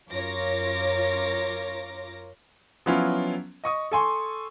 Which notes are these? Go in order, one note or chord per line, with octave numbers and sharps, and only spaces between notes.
F#2 F4 A#4 C#5 D6 A#6
F3 F#3 B3 C#4 E4 F4
D#5 C#6 D#6
A4 G#5 C6 C#6